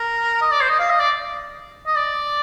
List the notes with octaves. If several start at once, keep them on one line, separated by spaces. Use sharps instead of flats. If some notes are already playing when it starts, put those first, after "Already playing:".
Already playing: A#4
D#5
D5
C5
D#5
F5
D#5
D5
D#5
D5